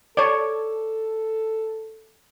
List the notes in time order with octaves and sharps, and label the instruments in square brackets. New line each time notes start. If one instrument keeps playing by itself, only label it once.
[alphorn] A4 [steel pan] C#5 D5